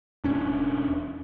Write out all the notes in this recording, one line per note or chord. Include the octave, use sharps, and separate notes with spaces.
E1 C#4 D4